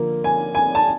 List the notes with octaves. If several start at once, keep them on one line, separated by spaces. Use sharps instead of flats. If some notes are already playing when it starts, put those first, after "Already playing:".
Already playing: D3 F3 A#3
G#5
G#5
A5